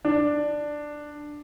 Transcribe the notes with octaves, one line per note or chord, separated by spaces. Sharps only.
D4